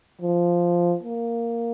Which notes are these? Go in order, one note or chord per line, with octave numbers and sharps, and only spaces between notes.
F3
A#3